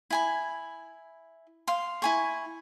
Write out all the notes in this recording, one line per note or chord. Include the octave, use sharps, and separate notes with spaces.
E4 G#5 B5
F5 C6
E4 G#5 C#6